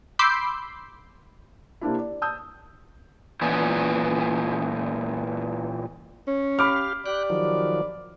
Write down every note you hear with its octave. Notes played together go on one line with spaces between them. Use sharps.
B5 C6 D6 E6 G6 C7
C3 A#3 D4 E4
D5
A5 D#6 E6 G6
A#2 E3 B3 C#4 F4
C#4
G4 F5 B5 D6 F6
G4 D5 G5 F#6
D#3 F3 F#3